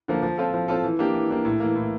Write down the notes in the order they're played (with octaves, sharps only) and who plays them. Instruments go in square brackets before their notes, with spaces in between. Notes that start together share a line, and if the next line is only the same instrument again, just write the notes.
[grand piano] D3 F3 A#3
F3
C4 F4 A4
F3
C4 F4 A4
E3
A#3 D4 G4
E3
A#3 D4 G4
A2
E3 A#3
A2